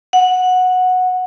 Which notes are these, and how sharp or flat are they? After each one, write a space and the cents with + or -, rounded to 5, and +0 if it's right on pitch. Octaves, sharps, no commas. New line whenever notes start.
F#5 -10